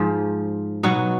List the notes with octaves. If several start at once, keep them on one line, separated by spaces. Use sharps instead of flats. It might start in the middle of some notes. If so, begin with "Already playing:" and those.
Already playing: G#2 F3
B2 F#3 D#4 F#4